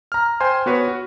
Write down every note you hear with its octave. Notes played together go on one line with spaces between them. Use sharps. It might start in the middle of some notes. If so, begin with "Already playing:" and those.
A#5 F6
C5 G5 G#5 C6
B3 F#4 B4 C#5
F#4